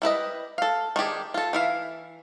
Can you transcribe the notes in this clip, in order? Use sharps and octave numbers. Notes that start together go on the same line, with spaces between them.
G3 E4 B4 D#5
A4 F5
D#3 D4 G4 G#4
F4 A4
E3 E4 F5